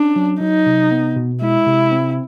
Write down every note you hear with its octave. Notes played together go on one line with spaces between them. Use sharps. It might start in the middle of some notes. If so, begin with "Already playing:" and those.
Already playing: C#4 D4
F#3
F#3 D#4
C3
B3
B2
G#3 E4
C3
C4